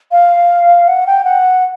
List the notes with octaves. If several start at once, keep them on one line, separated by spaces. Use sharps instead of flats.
F5
F#5
G5
F#5